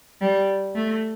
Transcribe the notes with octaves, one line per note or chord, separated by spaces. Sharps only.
G3
A3